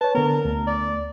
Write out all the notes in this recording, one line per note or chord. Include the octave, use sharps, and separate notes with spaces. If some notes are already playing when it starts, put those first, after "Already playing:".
B4 C#5 A5
D3 B3 A#4
D2
D5